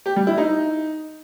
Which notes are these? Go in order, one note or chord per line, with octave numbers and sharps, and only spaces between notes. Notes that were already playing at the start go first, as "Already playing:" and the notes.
G4
G3
E4
D#4